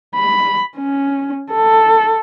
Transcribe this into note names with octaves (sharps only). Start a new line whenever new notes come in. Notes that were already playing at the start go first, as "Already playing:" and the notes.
B5
C#4
A4